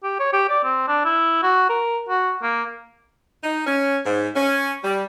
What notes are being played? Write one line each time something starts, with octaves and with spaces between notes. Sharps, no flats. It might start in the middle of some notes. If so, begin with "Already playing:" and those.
G4
C#5
G4
D5
C4
D4
E4
F#4
A#4
F#4
A#3
D#4
C#4
G#2
C#4
G3